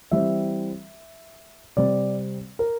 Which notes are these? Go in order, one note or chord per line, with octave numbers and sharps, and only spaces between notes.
E3 G3 C4 E5
C3 G3 C4 D5
A#4